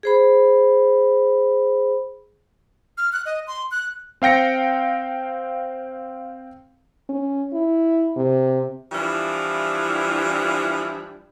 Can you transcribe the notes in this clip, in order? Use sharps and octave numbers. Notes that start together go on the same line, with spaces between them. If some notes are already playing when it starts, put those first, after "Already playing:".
G#4 C5 B5
F6
F#6
D#5
C6
F#6
C4 F5 G5 A#6 C#7
C#4
E4
C3
E3 F3 G3 D4 E4